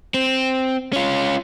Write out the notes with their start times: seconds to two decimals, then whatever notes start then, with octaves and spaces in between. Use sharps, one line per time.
0.14 C4
0.93 C#4 F4